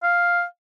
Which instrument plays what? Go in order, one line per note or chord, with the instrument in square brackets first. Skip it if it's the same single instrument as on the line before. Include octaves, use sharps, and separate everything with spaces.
[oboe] F5